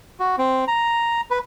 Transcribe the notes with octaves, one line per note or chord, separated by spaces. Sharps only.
F#4
C4
A#5
B4